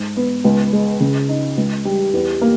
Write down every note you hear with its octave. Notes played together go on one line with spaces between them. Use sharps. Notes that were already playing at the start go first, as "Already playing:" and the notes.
Already playing: G#2
B3
C#2
G#3
C#3
D#4
C#2
G3
E2
A#3